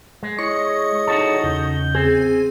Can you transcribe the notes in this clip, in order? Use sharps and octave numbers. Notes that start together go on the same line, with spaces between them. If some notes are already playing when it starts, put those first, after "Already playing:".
G#3
E4 G#4 C#5 D#5 C#6
D#4 F#4 A4
E2 C#3 G6
C4 G#4